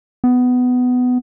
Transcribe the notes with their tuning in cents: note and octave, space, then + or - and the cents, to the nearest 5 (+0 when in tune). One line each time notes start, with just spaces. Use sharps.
B3 +15